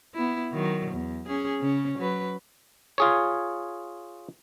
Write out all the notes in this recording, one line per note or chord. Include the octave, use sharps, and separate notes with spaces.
B3 E4
D#3 F#3
E2
C#4 G#4
C#3 C#4
F#3 B4
F4 G#4 C#5